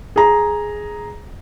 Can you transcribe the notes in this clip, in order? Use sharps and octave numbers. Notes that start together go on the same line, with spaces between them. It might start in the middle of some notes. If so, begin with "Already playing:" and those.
G#4 A#5